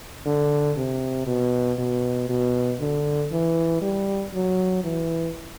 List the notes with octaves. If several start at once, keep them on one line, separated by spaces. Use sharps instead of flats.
D3
C3
B2
B2
B2
D3
E3
G3
F#3
E3